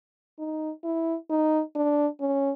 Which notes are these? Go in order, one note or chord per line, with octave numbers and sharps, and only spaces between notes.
D#4
E4
D#4
D4
C#4